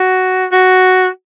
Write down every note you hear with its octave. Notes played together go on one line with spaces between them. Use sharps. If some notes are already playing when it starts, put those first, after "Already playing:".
Already playing: F#4
F#4